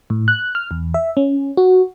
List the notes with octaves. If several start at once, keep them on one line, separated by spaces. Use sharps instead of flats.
A2
F#6
F6
E2
E5
C#4
F#4